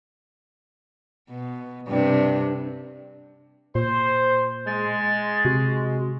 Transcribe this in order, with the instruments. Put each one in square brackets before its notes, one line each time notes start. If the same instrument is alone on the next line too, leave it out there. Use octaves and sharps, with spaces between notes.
[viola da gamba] B2
G2 C3 D4
[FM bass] A#2 [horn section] C5
[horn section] G#3 [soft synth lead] A6
[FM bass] C3 [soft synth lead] F#4